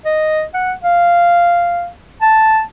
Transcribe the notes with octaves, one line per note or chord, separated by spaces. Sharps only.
D#5
F#5
F5
A5